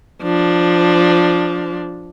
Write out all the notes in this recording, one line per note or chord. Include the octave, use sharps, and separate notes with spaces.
F3 D4